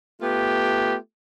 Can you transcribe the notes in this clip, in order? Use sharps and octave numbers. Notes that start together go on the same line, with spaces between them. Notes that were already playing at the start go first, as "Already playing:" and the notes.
A3 B3 F4 G4